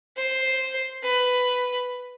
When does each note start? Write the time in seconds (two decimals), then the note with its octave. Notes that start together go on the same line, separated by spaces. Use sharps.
0.17 C5
1.03 B4